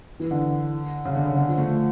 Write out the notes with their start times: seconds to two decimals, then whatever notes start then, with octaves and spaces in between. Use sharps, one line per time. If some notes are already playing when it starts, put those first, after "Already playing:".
0.20 E3
0.31 D3
1.05 C#3
1.16 D3
1.27 C#3
1.37 D3
1.48 F3
1.58 A3